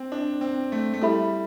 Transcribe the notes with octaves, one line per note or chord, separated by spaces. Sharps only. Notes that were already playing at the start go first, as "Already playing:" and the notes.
Already playing: C4
D4
C4
A3
A3
G3 E4 A4 E5 B5